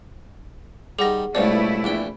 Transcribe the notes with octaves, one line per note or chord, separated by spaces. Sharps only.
D#3 G3 G#4 F#5 A#6
C#2 G2 B2 A3 E4 C5 D5
A#1 E2 G5